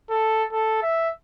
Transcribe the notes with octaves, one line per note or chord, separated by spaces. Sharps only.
A4
A4
E5